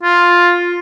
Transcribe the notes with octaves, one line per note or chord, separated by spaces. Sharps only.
F4